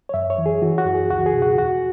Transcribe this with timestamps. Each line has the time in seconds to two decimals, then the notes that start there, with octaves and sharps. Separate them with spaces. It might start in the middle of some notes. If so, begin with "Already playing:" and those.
0.09 C#5
0.14 F#2 E5
0.30 C#5
0.38 E3
0.46 G#4
0.62 E3 F#4
0.78 F#4
0.86 F#2
0.95 G#4
1.10 C#2 F#4
1.26 G#4
1.35 B2
1.42 F#4
1.58 E2 F#4